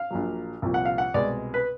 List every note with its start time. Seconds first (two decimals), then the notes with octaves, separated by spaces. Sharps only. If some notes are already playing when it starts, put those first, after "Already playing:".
Already playing: F5
0.11 A#1 A#2 F#3
0.62 C2 A#2 F3
0.74 F#5
0.85 F5
0.98 F#5
1.14 C2 B2 G#3 D5
1.54 B4